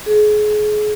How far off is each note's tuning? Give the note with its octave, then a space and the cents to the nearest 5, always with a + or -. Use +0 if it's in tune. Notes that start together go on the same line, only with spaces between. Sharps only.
G#4 +30